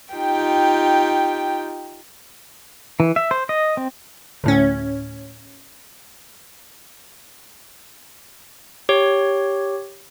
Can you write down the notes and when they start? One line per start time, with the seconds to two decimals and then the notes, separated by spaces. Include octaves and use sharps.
0.14 D#4 F4 G4 G5
3.00 E3
3.16 E5
3.31 C5
3.49 D#5
3.77 C4
4.44 D2 A2 C#4
8.89 G4 C#5